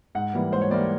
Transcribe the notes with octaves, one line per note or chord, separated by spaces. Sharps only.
G#2 F#5
E3 G3 A#3
G#2 C5
C#5
E3 G3 A#3 D5